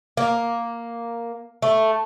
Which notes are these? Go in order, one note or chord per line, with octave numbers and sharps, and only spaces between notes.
A#3
A3